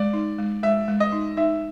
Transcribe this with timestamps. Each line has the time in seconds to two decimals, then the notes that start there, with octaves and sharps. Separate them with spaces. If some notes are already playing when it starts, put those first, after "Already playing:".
Already playing: G#3 D5
0.13 D#4
0.38 G#3
0.63 G#3 E5
0.88 G#3
1.00 D#5
1.12 D#4
1.37 D#4 E5